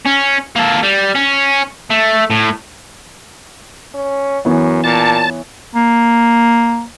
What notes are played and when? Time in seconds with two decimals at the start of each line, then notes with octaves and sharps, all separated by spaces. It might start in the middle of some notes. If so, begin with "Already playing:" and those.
0.05 C#4
0.56 A#3 A4
0.83 G3
1.16 C#4
1.90 A3
2.30 A2
3.94 C#4
4.45 F#2 E3 B3 C#5
4.84 A#2 A5
5.75 A#3